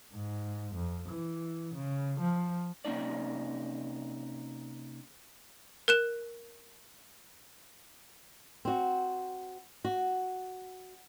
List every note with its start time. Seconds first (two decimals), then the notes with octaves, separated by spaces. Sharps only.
0.14 G#2
0.75 F2
1.09 E3
1.74 C#3
2.20 F3
2.85 C3 A#3 C#4 D#4 D5
5.88 A#4 F#6 E7
8.65 C4 F#4
9.85 F#4